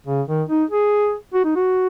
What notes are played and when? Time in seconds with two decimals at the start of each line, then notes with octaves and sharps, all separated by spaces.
0.07 C#3
0.27 D#3
0.49 D#4
0.70 G#4
1.34 F#4
1.45 D#4
1.55 F#4